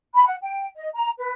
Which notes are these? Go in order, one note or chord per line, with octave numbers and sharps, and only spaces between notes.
B5
F#5
G5
D#5
A#5
B4